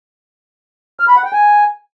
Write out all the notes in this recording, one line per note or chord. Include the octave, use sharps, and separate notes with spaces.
F6
B5
F#5
G5
G#5